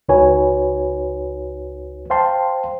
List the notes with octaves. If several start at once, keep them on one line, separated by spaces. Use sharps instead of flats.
C#2 D#4 F#4 B4 C#5 G#5
C5 F5 G5 A5 C6